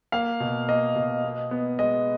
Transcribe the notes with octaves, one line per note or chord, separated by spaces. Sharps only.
A#3 F5
B2
A#3 D#5
B2
B3
B3
G#3 D#5